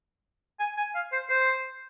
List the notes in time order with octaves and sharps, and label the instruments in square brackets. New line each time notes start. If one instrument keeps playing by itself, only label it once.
[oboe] G#5
G#5
F5
C5
C5